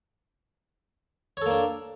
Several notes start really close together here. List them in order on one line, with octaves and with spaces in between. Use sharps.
C#5 A4 A#3 D4